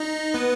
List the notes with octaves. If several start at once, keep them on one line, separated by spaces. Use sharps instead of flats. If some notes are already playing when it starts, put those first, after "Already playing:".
Already playing: D#4 D#5
B3 B4